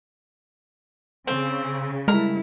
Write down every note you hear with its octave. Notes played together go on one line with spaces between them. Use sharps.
C#3 C4
G3 G#3 E4 A#4 A#5